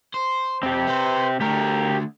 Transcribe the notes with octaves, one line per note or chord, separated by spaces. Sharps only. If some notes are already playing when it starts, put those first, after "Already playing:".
C5
F2 C4 G4
B4 C5
D3 A3 G4 A#4